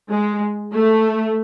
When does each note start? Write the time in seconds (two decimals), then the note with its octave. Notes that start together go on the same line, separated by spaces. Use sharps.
0.11 G#3
0.73 A3